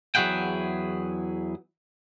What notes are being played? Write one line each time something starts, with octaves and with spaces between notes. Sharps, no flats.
E2 F#3 E4 G#4 F#5 G5